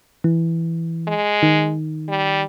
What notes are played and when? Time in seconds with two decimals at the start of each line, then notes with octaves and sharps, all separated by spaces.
0.24 E3
1.08 G#3
1.42 D#3
2.09 G3